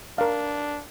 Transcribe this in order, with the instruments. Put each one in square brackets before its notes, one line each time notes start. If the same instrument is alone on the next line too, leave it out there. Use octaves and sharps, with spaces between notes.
[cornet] D4 [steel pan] A#4 F5